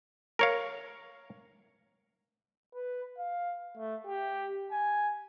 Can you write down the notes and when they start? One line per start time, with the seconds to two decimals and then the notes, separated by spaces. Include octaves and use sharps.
0.39 A#4 C#5 F5
2.74 B4
3.19 F5
3.78 A3
4.07 G4
4.71 G#5